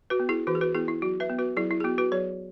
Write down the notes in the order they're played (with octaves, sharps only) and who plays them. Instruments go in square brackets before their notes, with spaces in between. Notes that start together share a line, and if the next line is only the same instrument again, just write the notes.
[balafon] F#4 B4
B3
E4 G#4
E3 F#4 B4
G#4
F#4 B4
B3 E4 G#4
E4
F#3 F#4
B4 E5
B3
F#4 B4
F#3 E4 G#4
E4
G#4
B3 F#4
F#4 B4
F#3 G#4 C#5